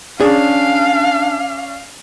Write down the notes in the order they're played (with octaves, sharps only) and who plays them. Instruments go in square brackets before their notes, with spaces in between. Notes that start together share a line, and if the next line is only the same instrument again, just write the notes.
[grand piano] C#4 D5 [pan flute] D4 [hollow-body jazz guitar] G#4 [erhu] F5